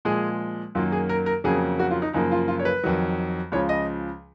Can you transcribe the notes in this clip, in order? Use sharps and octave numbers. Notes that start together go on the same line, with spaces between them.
A#2 F3 G#3 G#4
F#2 D#3 F#3 A#3 F4
G#4
A#4
A#4
F2 C#3 F#3 A#3 G#4
F#4
F4
D#4
F#2 C#3 F3 A#3 D#4
F4
F4
C#5
B4
F2 D#3 F#3
C#2 C#3 F3 C#5
D#5